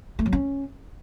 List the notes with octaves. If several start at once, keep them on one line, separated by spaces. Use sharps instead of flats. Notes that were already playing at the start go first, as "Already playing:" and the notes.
A3
F#3
C#4